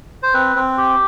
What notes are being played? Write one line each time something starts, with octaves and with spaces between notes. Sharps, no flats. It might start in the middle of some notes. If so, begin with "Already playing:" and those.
C5
C4 B4
C4
G4